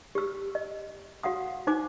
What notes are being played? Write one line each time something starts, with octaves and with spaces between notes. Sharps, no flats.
G4 E6
D#5
F#4 F5 F#5 D#6
D#4 C5 G#5 D6